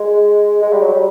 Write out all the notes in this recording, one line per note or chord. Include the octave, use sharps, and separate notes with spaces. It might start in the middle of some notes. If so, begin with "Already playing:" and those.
Already playing: G#3
G#3
G3
F#3
G3